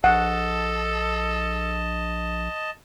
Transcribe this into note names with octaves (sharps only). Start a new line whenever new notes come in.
A#1 A4 D#5 F#5 A5